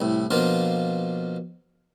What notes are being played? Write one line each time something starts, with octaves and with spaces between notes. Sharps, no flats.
C2 A2
B2 F3 A#3 D4 F4